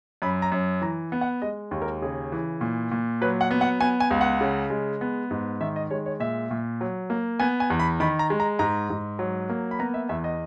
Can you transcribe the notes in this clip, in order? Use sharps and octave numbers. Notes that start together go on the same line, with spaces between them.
F#2 B5
A#5
F#2
E3 A#5
B3
F#5
G#3 D#5
D#2
A#4
C#3 G#4
E3
A#2
A#2
F#3 B4
F#5
B3
F#5
B3 G#5
G#5
C#2
F#5
C#3
G#3
B3
G#2
D#3 E5
D#5
G#3 C#5
C#5
A#2 E5
A#2
F#3
A#3
B3 G#5
G#5
E2
B5
D#3 B5
A#5
G#3
A#5
G#2 A#5
G#2
F#3
A#3
B5
B3 A#5
E5
E2 E5
D#5